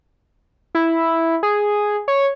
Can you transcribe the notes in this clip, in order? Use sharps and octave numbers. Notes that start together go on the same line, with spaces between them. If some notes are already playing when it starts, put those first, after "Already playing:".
E4
G#4
C#5